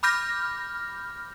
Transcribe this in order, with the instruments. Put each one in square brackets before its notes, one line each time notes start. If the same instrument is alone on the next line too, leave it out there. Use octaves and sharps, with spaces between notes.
[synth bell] B5 D6 F6 G6 A#6